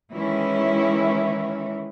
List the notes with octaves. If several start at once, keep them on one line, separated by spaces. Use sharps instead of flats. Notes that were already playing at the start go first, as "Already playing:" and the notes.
D#3 E3 G#3 C#4 E4